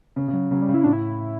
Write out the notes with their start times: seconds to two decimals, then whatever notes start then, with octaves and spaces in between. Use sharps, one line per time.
0.16 C#3
0.28 C#3
0.33 F#3
0.51 C#3 F#3
0.62 G3
0.69 C#3
0.74 E4
0.84 A2 D4
0.93 E4